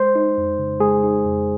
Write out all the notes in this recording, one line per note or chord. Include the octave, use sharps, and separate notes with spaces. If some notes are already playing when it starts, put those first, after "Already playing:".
Already playing: G#3 C5
D#4
F2
C#3
G#3 G#4
D#4
F2